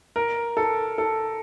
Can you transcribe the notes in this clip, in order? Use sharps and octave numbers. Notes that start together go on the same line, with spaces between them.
A#4
A4
A4